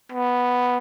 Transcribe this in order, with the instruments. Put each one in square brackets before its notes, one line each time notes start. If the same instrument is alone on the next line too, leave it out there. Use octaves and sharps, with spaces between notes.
[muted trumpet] B3